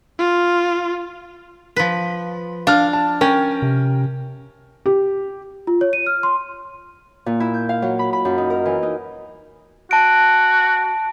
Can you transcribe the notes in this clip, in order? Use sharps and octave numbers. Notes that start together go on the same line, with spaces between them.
F4
F3 B4
D4 F5 F6
A5
C#4 A#4 G5
C3
G4
F4
C#5
D#7
F6
C6
A#2
E4
G6
F5
F#3
B5
B5
F#2
D#4
A#4
E3
D#4
F#4 A5 D7